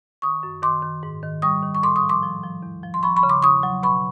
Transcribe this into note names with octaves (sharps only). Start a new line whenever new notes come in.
D#3 C#6 D#6
F#2
D#3 C6 D6
D#3
G#2
D#3
G3 C#6 D#6
D#3
C#6
A2 C6 D6
C#6 D#6
F3
C6 D6
F3
F3
E2
F3
C6
F3 B5 C#6
B5 C#6
C#3
C6 D6
E2 C#6 D#6
F#3
B2 B5 C#6